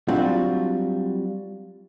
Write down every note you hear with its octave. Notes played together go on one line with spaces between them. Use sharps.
F#3 G3 C4 D4 F4 F#4